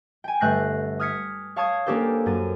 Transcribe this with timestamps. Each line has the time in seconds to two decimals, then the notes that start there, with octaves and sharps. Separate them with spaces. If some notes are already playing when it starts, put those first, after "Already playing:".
0.24 G5 G#5
0.40 G1 A3 F#6 G6 A#6 C7
1.00 D#6 F6 G#6 B6 C#7
1.56 C#5 F5 A5 C#6 D#6 G#6
1.86 A#3 C#4 D4 G4 A4 C5
2.26 F#2 A6 D#7